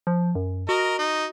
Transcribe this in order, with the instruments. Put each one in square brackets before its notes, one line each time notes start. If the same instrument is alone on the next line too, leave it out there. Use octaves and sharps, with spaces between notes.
[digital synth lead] F3
F#2
[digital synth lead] F#4 [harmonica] A#4 D#5
[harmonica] D#4